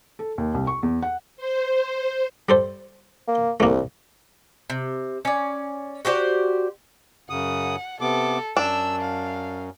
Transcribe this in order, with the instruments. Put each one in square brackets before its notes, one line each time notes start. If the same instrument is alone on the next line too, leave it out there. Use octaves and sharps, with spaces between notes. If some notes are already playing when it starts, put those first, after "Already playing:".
[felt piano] A4
D#2
C2
C#6
E2
F#5
[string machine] C5
[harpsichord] G3 A4 C5
[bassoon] A#3
[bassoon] C2 [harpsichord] A3 A#3
[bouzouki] C3
C#4 D5
F#4 G4 C5 D5
[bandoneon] F#2 C#3 D#6 [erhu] F#5
[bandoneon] C3 B3 D6 [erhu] A4
[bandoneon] F#2 [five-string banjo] D4 [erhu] E6
[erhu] F5